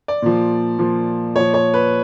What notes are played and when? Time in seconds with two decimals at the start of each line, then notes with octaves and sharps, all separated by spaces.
0.08 D5
0.22 A#2 F3
0.79 A#2 F3
1.35 A#2 F3 C#5
1.54 C#5
1.74 B4